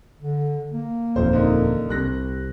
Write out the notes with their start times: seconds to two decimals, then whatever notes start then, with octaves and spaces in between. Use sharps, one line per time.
0.20 D3
0.72 A#3
1.16 D#1 F2 C5
1.33 D3 D#4 A#4
1.89 C2 C3 F#6 A#6